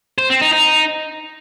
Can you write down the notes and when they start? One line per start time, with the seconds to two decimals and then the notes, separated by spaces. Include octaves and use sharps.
0.18 C5
0.30 C4
0.41 D#4
0.53 D#4